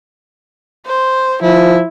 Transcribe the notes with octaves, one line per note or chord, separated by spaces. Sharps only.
C5
F3 E4